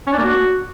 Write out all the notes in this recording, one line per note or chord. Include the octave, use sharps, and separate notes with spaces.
C#4
D4
A#3
F#4